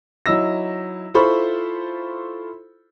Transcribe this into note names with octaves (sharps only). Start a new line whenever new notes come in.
F#3 D#4 E4 E6 A#6
E4 F4 A4 C5 B5 C#6